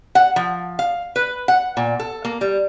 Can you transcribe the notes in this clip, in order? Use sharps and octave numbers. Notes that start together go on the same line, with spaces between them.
F#5
F3
F5
B4
F#5
A#2
A4
A#3
G3